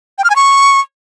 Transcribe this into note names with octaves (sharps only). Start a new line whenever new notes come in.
G5
F6
G#5
C#6